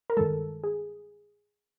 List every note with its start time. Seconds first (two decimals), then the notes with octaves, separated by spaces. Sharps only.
0.10 A#4
0.17 G2 D#3 G#3 A4
0.64 G#4